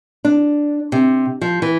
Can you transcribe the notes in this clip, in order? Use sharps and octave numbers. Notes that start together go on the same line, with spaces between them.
D4
C3
F3
E3